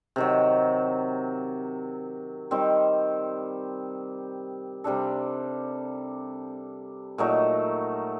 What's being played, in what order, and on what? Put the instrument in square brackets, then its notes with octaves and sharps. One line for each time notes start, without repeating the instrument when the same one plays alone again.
[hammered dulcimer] C3 D#3 F#3
D#3 G3 C4
C3 G3 D4 A4
A#2 F#3 A3 D#4